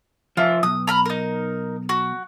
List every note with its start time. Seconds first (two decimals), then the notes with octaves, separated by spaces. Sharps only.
0.37 F3 F4 E5
0.63 B1 D#6
0.87 A#5 B5 F6
1.05 D#4 A#4
1.89 F#4